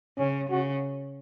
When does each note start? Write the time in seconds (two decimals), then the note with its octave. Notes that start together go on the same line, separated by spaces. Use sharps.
0.18 C#3 C#4
0.50 C#3 F#4